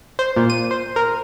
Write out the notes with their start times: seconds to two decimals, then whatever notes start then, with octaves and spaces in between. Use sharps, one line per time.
0.19 C5
0.36 A#2
0.50 D#7
0.71 C5
0.96 A#4